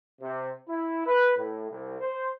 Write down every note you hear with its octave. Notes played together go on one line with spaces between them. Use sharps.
C3
E4
B4
A2
C2
C5